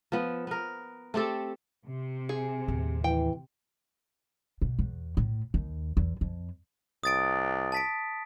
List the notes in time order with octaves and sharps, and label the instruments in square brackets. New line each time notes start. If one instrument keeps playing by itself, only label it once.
[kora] F3 B3
B3 A#4
A3 C4 G4 A4
[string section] C3
[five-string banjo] G#4
[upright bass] D#2 A2
[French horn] E3 [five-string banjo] G5
[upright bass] B2
E2
A2
D#2
E2
F2
[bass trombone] C2 [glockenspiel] D#6 A6 D7
[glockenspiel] A5 B6 D7